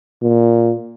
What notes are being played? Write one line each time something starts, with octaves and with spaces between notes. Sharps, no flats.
A#2